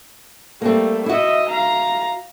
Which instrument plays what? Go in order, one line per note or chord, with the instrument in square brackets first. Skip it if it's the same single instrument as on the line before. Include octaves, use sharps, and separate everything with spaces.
[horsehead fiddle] G3 A3 [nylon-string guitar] A#3 C4
[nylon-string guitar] E4 F#4 [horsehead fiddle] D#5 E5
[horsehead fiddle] F5 A#5